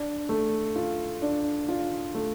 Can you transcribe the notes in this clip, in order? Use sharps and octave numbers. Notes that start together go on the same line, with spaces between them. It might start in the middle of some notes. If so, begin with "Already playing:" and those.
Already playing: D4
A3
F4
D4
F4
A3